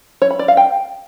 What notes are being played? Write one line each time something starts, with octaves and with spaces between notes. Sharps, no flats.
C#5
B5
D5
F5
G5